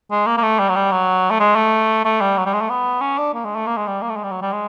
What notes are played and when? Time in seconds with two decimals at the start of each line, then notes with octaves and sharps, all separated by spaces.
0.11 G#3
0.27 A#3
0.37 A#3
0.43 A3
0.59 G3
0.69 F#3
0.75 G3
0.92 F#3
1.30 A3
1.40 G#3
1.56 A3
2.05 A3
2.21 G3
2.37 F#3
2.45 G3
2.53 G#3
2.61 A3
2.69 B3
3.01 C#4
3.18 D4
3.34 A#3
3.45 G#3
3.55 A3
3.66 A#3
3.77 G#3
3.87 G3
4.02 A#3
4.09 A3
4.16 G#3
4.24 G3
4.31 F#3
4.42 G3
4.52 G#3